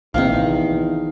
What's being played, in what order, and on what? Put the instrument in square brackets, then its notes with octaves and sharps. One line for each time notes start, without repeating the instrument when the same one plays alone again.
[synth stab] A#1 C3 [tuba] E2 [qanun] D#3 F3 D#4 [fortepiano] F5